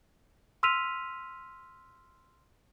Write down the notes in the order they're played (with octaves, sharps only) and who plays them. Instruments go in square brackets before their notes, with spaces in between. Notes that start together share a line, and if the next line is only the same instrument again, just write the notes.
[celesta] C6 E6 F6 B6 D#7 F7